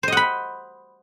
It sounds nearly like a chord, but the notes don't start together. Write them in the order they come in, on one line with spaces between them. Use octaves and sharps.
C5 D#5 F#5 B5